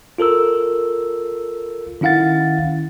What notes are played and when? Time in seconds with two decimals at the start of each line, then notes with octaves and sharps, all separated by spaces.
0.18 F4 A4 A#4 E6
2.01 D#3 C#4 E4 F5 F#5 A6